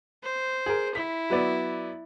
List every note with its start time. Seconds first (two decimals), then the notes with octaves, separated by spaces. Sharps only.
0.23 C5
0.66 G#4 A#4
0.95 E4 B6
1.30 F#3 B3 D5